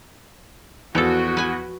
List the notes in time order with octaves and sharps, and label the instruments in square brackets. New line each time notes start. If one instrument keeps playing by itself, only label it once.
[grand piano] E2 [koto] F3 A4 [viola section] F#4
[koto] B4 G#5